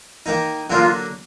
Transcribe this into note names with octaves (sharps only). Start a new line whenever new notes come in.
D#3 A#3 D#4
D3 F#3 A#3 D4 F4